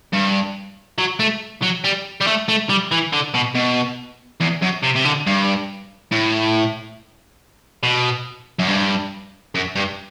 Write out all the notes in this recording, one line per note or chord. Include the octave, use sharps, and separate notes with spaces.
G2
F#3
A3
F#3
G3
G3
A3
A3
G3
E3
D3
B2
B2
E2
F#2
C3
C3
D3
G2
A2
B2
F#2
G2
F#2
G2